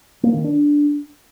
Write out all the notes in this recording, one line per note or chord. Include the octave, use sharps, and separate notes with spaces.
A#3
D#3
D4